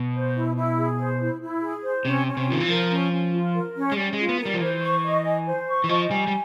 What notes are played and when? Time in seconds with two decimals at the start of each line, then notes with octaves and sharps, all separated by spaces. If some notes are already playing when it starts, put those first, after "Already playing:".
Already playing: B2
0.13 C5
0.34 E4
0.56 E4
0.77 G#4
0.98 C5
1.19 E4
1.41 E4
1.61 G#4
1.83 C5
2.05 C3 C#4
2.26 C#4
2.37 C3
2.47 D#3 F4
2.60 E3
2.68 F3 A#4
2.91 C#4
3.12 C#4
3.33 F4
3.54 A#4
3.76 C#4
3.92 G#3
3.96 G3 C#4
4.13 G#3
4.18 F4
4.29 B3
4.40 A#4
4.45 G3
4.54 F3
4.61 E3 C5
4.82 C#6
5.03 D#5
5.25 G#5
5.47 C5
5.67 C#6
5.84 E3
5.89 F3 D#5
6.10 G3 G#5
6.27 G3